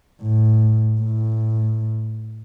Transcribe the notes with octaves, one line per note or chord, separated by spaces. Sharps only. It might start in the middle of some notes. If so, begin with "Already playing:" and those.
A2
A2